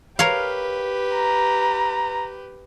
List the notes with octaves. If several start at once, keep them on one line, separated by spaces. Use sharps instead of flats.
G4 A#4 B4 C#5 F5
A#5